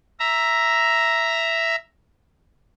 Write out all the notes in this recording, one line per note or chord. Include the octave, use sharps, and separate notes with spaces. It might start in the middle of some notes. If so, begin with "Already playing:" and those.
E5 A#5